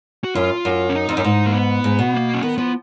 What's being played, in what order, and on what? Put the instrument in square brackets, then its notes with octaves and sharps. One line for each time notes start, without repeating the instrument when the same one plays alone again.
[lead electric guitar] F#4
[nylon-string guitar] F#2 [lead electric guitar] F4
[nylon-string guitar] F#2
[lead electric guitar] C#4
D#4
[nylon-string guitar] F2
F#2
G#2
[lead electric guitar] A#3
B3
[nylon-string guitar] G#2
B2
[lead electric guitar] A#3
C#4
[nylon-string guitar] D#3 [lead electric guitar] B3
[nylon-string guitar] F3 [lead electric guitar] B3